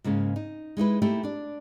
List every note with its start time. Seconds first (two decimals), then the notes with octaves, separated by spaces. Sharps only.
0.04 G#2 C#3 A#3 C#4
0.36 D#4
0.77 G#3 D#4 E4 B4
1.02 A3 A#3 D#4 E4 G4
1.23 D4 D5